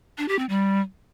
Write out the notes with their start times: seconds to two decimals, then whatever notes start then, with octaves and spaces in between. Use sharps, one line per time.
0.18 D4
0.28 G4
0.39 C4
0.49 G3